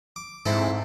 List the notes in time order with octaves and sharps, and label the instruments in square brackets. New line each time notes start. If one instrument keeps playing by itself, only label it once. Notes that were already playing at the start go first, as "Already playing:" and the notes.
[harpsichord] D6
[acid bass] G#2 [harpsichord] C4 E4 A4